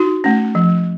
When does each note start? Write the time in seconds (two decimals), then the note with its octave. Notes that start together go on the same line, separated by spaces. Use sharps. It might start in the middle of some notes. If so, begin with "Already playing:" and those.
Already playing: D#4 F#4
0.24 A3 C#4
0.55 F3